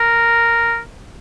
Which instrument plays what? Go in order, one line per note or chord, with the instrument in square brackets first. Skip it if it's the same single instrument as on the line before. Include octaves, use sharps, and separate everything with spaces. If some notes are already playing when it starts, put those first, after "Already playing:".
Already playing: [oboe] A#4